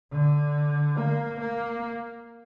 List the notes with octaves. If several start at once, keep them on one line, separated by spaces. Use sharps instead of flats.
D3
A#3
A#3